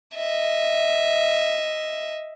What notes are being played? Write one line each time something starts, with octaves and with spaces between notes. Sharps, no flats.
D#5 E5